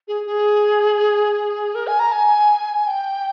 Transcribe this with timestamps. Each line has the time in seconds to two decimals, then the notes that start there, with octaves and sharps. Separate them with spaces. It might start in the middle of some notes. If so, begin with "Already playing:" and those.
0.08 G#4
0.26 G#4
1.75 A#4
1.87 G#5
2.00 A#5
2.12 G#5
2.87 G5